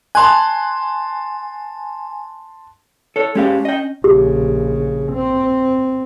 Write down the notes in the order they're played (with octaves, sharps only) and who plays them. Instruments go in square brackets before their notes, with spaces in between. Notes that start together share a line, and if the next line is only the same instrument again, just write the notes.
[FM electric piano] G#5 [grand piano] A5 C6 F#6
[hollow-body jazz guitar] A4 C#5
[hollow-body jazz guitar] G#3 G4 F5 [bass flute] C#4
[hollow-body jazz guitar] D#5 G5
[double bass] A#1 C#3 [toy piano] G4
[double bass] C4